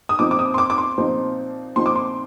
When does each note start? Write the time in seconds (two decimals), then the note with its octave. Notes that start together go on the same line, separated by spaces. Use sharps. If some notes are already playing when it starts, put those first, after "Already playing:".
0.09 D#6
0.19 A#2 F3 C4 D#4 D6
0.31 D6
0.39 D#6
0.54 C6
0.58 D6
0.70 D6
0.78 C6
0.98 A#2 F3 C4 D#4
1.76 A#2 F3 C4 D#4 C6
1.86 D6
1.96 C6